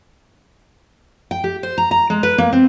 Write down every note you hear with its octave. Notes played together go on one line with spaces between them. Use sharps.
G5
G4
C5
A#5
A#5
G#3
B4
A#3
C4